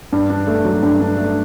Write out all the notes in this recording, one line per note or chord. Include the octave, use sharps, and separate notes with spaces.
G2
D4
A3
F#3
G2
D4
A3